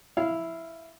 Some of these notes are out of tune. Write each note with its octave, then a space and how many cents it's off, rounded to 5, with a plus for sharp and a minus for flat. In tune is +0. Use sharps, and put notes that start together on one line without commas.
E4 +0 F5 -15